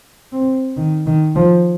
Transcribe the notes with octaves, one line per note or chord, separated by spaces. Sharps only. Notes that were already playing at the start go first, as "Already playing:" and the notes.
C4
D#3
D#3
F3